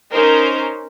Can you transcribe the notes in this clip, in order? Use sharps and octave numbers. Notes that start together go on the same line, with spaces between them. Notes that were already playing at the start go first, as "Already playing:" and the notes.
C#4 D#4 A#4 C5